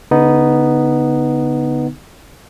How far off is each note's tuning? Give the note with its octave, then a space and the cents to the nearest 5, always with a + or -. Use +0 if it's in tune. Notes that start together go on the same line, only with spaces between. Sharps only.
D3 -40 B3 +0 D#4 +0